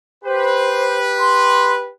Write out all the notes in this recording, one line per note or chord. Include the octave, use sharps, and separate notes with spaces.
G4 B4 C5
C6